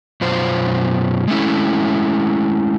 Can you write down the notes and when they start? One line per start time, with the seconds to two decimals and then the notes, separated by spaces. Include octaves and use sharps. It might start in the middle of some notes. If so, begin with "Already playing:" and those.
0.21 F#2 B2 F4 C5
1.28 G#3 A3 C#4 E4